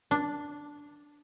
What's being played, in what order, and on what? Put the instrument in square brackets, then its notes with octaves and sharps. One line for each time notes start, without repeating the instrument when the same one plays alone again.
[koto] D4